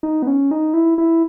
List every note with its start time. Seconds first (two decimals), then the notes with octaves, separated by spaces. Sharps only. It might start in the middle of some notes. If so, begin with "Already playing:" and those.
0.03 D#4
0.22 B3
0.27 C#4
0.51 D#4
0.74 E4
0.98 E4